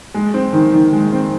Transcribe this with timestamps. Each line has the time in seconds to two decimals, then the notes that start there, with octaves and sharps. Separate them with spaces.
0.14 G#3
0.34 C4
0.53 D#3
0.73 D#3
0.93 G#3
1.12 C4